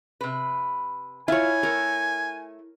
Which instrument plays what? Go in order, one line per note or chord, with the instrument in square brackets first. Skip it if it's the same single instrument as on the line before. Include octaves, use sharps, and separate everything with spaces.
[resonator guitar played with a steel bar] C3 B4
[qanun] E4 C#5 [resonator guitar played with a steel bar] F4 [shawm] G#5
[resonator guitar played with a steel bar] A3 E4 C#5 [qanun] A#4